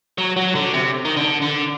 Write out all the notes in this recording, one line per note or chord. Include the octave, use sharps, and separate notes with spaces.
F#3
F#3
D3
C3
D#3
D3
D3